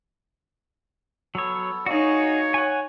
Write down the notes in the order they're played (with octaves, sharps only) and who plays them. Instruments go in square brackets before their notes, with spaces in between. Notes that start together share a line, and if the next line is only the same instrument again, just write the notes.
[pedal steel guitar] F#3 C#5 [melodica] B3 A4
[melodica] F#3 A#3 [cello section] D#4 [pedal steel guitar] F#4 G#4 [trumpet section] C#5
[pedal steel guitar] F#5 G#5